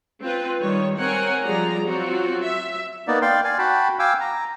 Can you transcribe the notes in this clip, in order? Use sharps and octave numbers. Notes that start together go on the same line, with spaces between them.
C4 F4 B4
D#3 G3 C#5
C4 A#4 C#5 F#5 G#5
F3 G3 G#4 D5 A#5
F#3 C4 F4 F#4
E5
A#3 B3 D#4 D5
D5 F5 G5 C6
D5 F5 G#5
F#4 G5 A5 B5
F5 G5 G#5 D6 E6
A#5